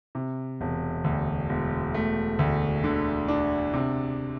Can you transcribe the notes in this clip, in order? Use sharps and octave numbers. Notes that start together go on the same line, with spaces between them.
C3
E1
D2
E1
A3
D2
D3
D4
C3